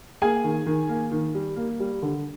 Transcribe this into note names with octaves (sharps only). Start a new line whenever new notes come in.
A#3 G#4 G#5
D#3
D#3
A#3
D#3
G3
A#3
G3
D3